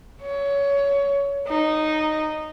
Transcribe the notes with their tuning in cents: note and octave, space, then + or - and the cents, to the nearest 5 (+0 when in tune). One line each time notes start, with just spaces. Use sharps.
C#5 +20
D#4 -10